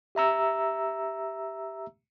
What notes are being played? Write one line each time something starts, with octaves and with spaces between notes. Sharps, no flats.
G4 E5 A#5 E6